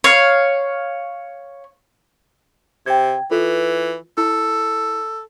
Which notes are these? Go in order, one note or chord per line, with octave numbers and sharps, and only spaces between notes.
C#5 F5
C3 G5 G#6
E3 F4 A4 B4
E4 A4